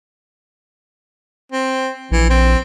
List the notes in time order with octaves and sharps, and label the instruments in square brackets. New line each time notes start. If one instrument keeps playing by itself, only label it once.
[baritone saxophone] C4
[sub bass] A#1 [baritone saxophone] E3
[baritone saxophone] C4